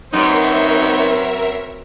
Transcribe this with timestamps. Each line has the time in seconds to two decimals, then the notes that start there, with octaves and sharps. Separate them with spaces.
0.13 F#2 C4 D#4 A#4 B4 C#5 E5